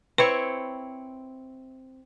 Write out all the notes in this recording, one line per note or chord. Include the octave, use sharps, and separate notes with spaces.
C4 E4 B4 C#5